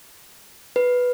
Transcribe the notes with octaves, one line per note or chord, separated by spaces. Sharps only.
B4